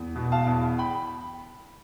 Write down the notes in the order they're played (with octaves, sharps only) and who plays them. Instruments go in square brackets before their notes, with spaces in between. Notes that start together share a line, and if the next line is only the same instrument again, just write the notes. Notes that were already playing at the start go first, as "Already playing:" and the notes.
Already playing: [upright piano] E2
B2
F5 A5
E2
G5 B5